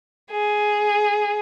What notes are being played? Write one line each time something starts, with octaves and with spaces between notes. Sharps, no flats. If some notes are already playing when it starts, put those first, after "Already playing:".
G#4